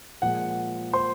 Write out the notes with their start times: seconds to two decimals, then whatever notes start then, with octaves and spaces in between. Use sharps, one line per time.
0.22 A#2 F3 G#3 F#5
0.93 C5 C6